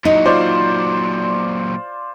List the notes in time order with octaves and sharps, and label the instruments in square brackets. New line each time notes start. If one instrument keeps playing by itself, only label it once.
[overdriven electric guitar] A#2 F#3 [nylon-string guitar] D#4
[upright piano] F4 C5 D5